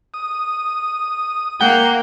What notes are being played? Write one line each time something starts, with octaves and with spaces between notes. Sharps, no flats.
D#6
A#3 F#5 G5